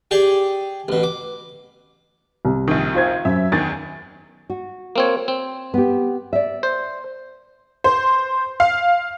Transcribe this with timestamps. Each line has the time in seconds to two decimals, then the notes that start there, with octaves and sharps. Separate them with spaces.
0.11 G4 G#4 D5
0.88 A1 B2
1.03 D6
2.45 C2
2.68 A#1 D#3
2.95 F4 C5 G#6
3.25 F#2 E5
3.52 E2 D#3 A6
4.50 F#4
4.96 A#3 C4 C#5
5.28 C4
5.74 B3 G4
6.33 D5 E5
6.63 C5
7.84 C5
8.60 F5